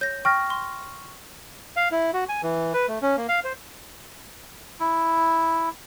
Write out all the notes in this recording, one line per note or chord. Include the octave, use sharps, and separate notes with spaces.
C#5 G6 A#6
G5 C#6 F6 A#6
C6
F5
E4
F#4
G#5
E3
B4
A3
C#4
A#3
F5
C5
E4